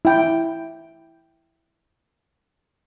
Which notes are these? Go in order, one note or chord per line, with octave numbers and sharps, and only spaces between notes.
E4 G5